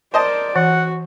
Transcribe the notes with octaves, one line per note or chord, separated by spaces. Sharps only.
A#4 C5 D5 D#5 A5
E3 F#4 F#5